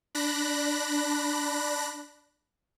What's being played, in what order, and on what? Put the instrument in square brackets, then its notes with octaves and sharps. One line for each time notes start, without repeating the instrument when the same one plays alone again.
[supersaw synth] D4 B5 F#6 A#6